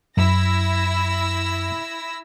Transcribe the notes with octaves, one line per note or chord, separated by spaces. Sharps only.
F#2 E4 E6 A#6